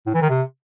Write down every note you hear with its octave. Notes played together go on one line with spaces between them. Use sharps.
A2
E3
D#3
C3